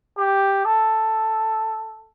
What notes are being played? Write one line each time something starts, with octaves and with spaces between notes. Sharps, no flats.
G4
A4